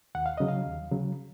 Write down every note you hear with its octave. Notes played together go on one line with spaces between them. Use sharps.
D#2 F#5
F5
C#3 F#3 D#5
F5
D#2
C#3 F#3